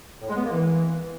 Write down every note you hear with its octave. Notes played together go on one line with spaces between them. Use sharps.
A2
G#3
B3
A#3
E3